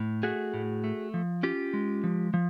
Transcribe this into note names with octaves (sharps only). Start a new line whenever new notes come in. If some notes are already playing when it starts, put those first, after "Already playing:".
Already playing: A2
A3 F#4 G#4
A2
A3
F3
C#4 F4 G4
G#3
F3
F3